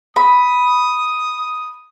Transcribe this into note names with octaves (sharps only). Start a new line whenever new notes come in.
B5 D#6